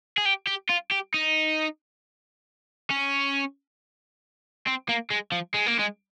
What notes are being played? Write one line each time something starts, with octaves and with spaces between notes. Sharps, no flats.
G#4
G4
G4
F4
G4
D#4
C#4
C4
A#3
G#3
F3
G#3
A#3
G#3